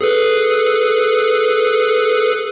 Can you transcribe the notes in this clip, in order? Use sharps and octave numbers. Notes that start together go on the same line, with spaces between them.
G#4 A4 B4